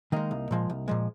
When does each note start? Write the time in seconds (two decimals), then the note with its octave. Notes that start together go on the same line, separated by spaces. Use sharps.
0.12 D#3 G#3 A#3 D#4
0.31 C2
0.51 A#2 F3 G#3
0.70 C2
0.88 A#2 F3 G#3